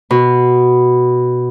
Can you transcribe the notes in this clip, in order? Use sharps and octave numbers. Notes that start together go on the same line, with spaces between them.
B2